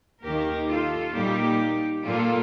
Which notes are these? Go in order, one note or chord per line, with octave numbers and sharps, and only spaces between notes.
D#2 D#3 A#3 G4 A#4
F4 A4
A#2 G3 A#3 D#4 G4
A#2 G3 A#3 F4 A4